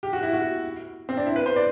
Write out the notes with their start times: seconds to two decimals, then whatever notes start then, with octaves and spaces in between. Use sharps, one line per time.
0.03 G4
0.13 F#4
0.23 E4
0.33 F#4
1.09 C4
1.17 D4
1.26 E4
1.36 B4
1.46 C5
1.56 D5